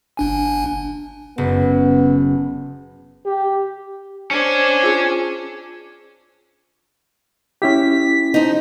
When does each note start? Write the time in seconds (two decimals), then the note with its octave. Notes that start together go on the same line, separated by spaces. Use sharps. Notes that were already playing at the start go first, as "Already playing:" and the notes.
0.17 G1 D4 G#5
1.38 F#1 B3
3.25 G4
4.31 C#4 D4 C5
4.83 F4 G#4 D6
7.62 C#4 E4 G4 B6
8.34 F3 D#4